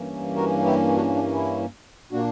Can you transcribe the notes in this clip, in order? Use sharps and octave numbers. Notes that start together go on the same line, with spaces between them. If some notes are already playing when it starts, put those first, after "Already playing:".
Already playing: G2 E3 A#3 C#4
F#4 A#4
E4 G4
D4 F#4
D4
E4
A#2 A#3 D4 F#4